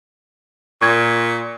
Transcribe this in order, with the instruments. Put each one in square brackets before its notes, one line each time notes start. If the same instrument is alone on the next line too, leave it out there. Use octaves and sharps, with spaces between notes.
[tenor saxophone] A#2 [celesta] C#6 G#6